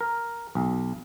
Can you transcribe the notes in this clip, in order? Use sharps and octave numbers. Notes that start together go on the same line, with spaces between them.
A#4
B1